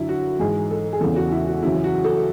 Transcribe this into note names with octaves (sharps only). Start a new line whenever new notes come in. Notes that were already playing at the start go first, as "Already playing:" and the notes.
Already playing: F#2 D3 E4
F#4
G#2 E3 G#4
A4
G#4
E2 C#3 E3 A4
F#4
E4
F#4
F#2 C#3 E3 E4
F#4
A4